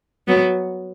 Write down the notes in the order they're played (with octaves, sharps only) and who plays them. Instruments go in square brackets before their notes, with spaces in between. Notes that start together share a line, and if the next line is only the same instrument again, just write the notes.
[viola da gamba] F#3 B3